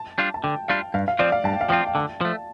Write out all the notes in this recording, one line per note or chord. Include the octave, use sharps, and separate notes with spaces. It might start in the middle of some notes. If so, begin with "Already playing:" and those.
Already playing: A5
G3 D4 F4
A5
D3 G5
G3 D4 F4 F5
G2 F5
F5
F3 C4 F4 D5
F5
G2 A5
G5
F5
F3 C4 F4 G5
G5
D3 A5
F3 A3